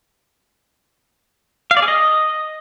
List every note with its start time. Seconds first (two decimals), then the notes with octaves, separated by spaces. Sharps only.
1.71 F5
1.77 D5
1.82 G#4
1.88 D#5